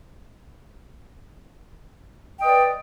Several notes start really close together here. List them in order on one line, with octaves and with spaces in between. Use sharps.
G5 D#5 B4 D5